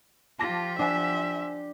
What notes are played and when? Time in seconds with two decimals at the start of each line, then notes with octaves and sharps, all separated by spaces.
0.39 F3 F4 G4 A5 D6 A#6
0.79 D4 C5 E5 F#5 G#5